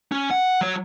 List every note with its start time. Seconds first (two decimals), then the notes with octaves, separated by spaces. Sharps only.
0.12 C#4
0.31 F#5
0.61 F#3 C#5